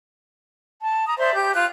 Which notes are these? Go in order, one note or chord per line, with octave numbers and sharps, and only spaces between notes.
A5
A#5 D#6
C5 D5 E5 C6
G4 G6
F4 F#6